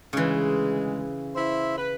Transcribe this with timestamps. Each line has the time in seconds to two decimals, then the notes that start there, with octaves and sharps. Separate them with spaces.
0.13 D2 C#3 E3 G#3
1.35 E4 C5 E5
1.77 B4